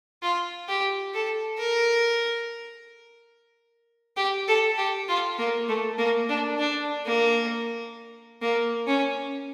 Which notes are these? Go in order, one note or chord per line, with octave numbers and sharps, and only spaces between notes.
F4
G4
A4
A#4
G4
A4
G4
F4
A#3
A3
A#3
D4
D4
A#3
A#3
C#4